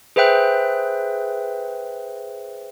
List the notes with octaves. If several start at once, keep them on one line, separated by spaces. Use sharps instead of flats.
G#4 B4 C5 E5 G5 F#6